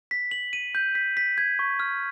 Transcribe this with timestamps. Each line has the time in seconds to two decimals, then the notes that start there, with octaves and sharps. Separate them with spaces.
0.11 B6
0.31 F#7
0.53 D#7
0.75 G6
0.95 B6
1.17 B6
1.38 G#6
1.59 C#6
1.80 F6